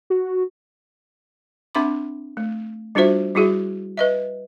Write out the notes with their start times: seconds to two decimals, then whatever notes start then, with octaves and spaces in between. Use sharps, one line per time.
0.10 F#4
1.75 C4 D4 E5 B5 C6 D6
2.37 A3
2.95 G3 D4 F4 F#4 C5 E5
3.35 G3 E4 F#4 G#4 E5
3.97 B4 D#5 E5